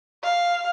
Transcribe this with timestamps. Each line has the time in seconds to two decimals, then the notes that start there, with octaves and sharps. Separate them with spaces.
0.24 F5